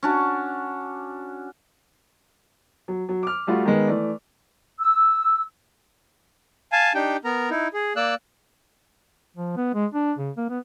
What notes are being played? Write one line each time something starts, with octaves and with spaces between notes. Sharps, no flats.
C#4 D4 F#4
F#3
F#3
D6 F6
G3 A3 F4 F#4
D#3 G#3 B3
E3 A3 D5
E6
F5 G#5 A5
D4 D#4 G4 G5
B3 A#4 A#5
D#4 E4
G#4
A#3 D5 E6 F#6
F3
B3
G#3
D4
C#3
A#3
B3